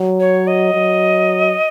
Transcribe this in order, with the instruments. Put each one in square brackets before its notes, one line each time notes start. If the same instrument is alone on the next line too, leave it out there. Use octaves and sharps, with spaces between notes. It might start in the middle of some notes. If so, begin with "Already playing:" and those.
Already playing: [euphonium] F#3
[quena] C#5
D#5
[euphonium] F#3